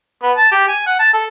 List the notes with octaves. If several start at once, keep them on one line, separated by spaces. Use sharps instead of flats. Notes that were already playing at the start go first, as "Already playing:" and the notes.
B3
A5
G4
G#5
F#5
A5
A4